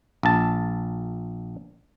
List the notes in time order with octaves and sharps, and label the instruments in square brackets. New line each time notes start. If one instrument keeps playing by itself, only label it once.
[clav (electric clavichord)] A#1 A5